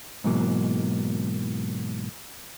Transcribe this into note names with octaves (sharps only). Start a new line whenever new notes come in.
G#2 B2 E3 F#3 A#3